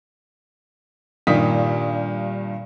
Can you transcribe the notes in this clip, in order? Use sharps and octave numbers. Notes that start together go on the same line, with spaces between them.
G2 A#2 D#3 D#6 B6